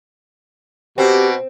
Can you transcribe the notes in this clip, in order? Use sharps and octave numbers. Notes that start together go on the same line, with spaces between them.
B2 C4 G4